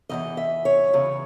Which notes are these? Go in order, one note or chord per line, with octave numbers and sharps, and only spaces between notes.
E2 C#3 E3 D#5
E5
C#5
E2 C#3 E3